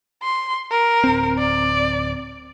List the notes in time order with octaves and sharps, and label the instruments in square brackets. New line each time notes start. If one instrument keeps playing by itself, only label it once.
[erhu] C6
A#4
[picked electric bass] D1 C4
[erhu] D5